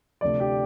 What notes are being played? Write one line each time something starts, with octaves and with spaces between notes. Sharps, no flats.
D2 C3 F3 A3 D5
G4